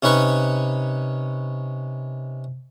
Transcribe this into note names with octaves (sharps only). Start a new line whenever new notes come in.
C3 C#4 D#4 B4 C#6